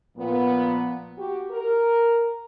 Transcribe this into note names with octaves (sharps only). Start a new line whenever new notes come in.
A#2 F3 B3
F#4 G4
A#4